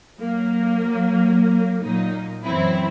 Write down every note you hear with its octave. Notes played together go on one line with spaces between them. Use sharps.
F#3 A#3
A#2 F#3 A#3 D#4
F#2 E3 F#3 C4 E4